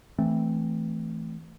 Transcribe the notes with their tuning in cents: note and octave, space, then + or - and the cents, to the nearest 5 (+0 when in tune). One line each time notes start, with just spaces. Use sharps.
E3 +0 A3 +0 C4 +0